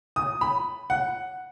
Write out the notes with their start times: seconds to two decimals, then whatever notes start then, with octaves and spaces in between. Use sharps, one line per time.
0.16 D#6
0.41 B5
0.90 F#5